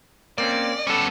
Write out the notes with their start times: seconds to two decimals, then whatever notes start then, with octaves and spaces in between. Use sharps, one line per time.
0.38 A#3 C4 C#4 D5
0.87 G3 B3 C#4 A4